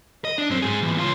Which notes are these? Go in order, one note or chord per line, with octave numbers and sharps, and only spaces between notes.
D#5
D4
F#2 C4
G#2 G#4
E2 A#2
C#2 F4